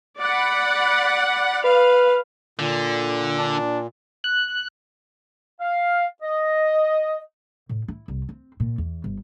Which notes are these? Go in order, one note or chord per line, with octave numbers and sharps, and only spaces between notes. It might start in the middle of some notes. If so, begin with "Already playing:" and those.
D5 F#5 B5
B4 F5
A#2 D3
D4
F#6
F5
D#5
A2
E4
C2
C4
A#2
E2
G1